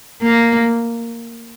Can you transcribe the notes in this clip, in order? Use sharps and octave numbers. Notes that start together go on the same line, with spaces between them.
A#3